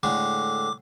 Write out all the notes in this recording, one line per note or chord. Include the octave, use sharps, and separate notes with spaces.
A2 D3 G#3 D6